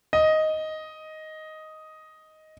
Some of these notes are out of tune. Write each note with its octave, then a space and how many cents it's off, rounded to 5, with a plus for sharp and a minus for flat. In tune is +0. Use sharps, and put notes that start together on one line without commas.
D#5 +5